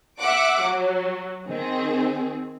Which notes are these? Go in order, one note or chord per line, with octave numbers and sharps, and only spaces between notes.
E5 F#5 D6
F#3
D#3 C4 G#4